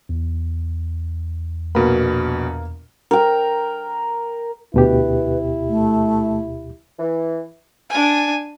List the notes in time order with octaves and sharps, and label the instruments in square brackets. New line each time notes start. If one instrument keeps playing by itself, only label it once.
[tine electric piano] E2
[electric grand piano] A#1 B2 B5 [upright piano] A#3 B3
[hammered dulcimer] A#4 G5
[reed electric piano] D2 B2 G4 [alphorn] E4 [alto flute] B4
[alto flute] A3
[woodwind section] E3
[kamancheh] D4 G#5